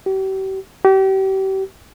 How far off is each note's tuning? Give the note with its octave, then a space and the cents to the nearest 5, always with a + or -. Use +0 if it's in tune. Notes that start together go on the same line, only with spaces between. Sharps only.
G4 -40
G4 -35